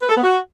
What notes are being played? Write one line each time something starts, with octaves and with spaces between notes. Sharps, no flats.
B4
A4
B3
F#4